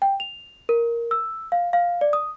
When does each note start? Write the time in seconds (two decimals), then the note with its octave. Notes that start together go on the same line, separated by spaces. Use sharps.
0.02 G5
0.20 F7
0.69 A#4
1.11 E6
1.52 F5
1.73 F5
2.01 D5
2.13 D#6